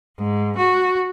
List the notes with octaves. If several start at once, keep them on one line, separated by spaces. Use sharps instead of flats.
G#2
F#4